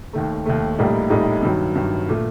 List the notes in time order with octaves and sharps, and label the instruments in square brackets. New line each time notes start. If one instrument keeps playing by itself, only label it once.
[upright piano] D#2 D#3 A3
D#2 D#3 A3
A#1 A2 G3 A#3 D#4
A#1 A2 G3 A#3 D#4
G2 D#3 F#3
G2 D#3 F#3
A#2 A3